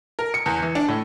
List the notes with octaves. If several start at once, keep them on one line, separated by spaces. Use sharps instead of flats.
A#4
C#7
E2
E3
D4
A2